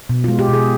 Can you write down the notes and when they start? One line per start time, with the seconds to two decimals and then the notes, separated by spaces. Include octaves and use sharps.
0.09 B2
0.24 G#3 F4
0.39 G4
0.48 B2
0.53 G#4